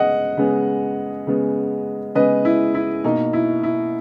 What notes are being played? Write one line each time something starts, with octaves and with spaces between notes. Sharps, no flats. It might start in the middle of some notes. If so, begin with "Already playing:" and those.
Already playing: C#3 G#3 B3 D#5 F#5
C#3 G#3 B3
C#3 G#3 B3
C#3 G#3 B3 B4 D#5
E4
E4
B2 A#3 D#4
E4
E4